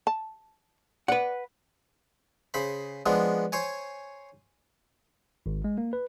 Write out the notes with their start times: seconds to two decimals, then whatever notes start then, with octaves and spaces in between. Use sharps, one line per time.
0.07 A5
1.08 B4 D5 F#5
2.54 C#3 C5 B5
3.06 F3 G#3 B3 D4
3.52 C5 C#5 G#5
5.46 G#1
5.64 G#3
5.78 A#3
5.93 B4